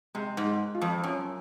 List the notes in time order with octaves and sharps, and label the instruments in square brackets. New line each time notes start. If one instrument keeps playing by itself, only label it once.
[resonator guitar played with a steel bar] C3 [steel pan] G#3
[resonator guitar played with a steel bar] G#2
[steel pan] G#3
F4
[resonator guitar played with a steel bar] F2
[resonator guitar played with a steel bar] F#2 [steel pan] C#4